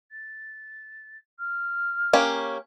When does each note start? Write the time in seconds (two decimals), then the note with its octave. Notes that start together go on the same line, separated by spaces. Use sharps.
0.11 A6
1.39 F6
2.13 A#3 C#4 G4